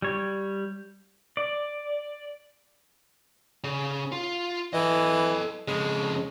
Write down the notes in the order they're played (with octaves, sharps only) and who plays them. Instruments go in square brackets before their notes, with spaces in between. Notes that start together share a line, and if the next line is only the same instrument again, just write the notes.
[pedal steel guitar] G3 C#5
D5
[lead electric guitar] C#3
F4
[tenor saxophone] E3 [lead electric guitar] A4 D#5
[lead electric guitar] F2 C#3 [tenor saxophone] G#3